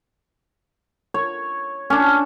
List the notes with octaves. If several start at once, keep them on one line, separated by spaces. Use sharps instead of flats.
C#5
C#4 D4